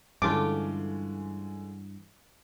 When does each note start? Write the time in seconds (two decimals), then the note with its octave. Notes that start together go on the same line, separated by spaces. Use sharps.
0.22 G2 D3 E3 G#3 A3 C#4 F4 D6